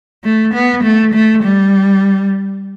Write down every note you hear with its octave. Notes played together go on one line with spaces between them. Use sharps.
A3
B3
A3
A3
G3